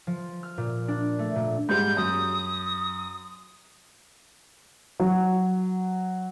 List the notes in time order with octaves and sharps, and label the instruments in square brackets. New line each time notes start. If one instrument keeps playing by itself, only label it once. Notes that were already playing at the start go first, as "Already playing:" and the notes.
[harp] F3
F6
A#2
D4
A3
A#2
[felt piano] G#2 G3 G#3 [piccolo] G6
[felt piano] F#2 [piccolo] D#6
[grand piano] F#3